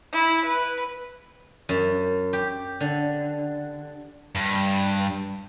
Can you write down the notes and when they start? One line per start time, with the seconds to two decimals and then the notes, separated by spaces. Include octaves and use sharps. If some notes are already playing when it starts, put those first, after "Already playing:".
0.12 E4
0.45 B4
1.69 F#2
2.33 G4
2.81 D3
4.35 G2